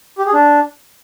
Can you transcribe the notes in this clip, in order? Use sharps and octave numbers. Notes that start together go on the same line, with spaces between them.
G4
G#4
D4